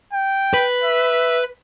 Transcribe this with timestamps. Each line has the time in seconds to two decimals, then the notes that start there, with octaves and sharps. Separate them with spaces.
0.13 G5
0.54 B4
0.83 E5